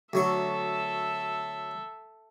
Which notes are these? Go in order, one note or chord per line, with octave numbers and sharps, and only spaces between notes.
D2 F#3 A4 E5 C#6